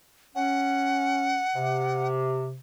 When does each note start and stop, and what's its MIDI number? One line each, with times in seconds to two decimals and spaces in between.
0.35 1.41 61
0.35 2.07 78
1.55 2.58 48